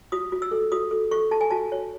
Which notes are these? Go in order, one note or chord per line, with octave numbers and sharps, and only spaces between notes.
F#4 D#6
F#4
E6
A4
F#4 D#6
A4
A4 C#6
A4 A5
G#5
F#4 A5
C#5